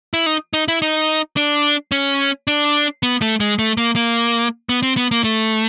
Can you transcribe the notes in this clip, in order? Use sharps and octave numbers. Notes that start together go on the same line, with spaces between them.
E4
D#4
D#4
E4
D#4
D4
C#4
D4
B3
A3
G#3
A3
A#3
A#3
B3
C4
B3
A#3
A3